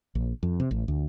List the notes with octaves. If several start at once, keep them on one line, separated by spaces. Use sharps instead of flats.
A#1
F2
C3
A1
D2